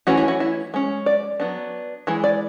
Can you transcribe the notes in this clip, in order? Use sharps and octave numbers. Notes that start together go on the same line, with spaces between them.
E3 A3 C#4 F#4
E4
F#4
E4
G#3 C#4
D5
F#3 B3 D4
E3 G#3
D5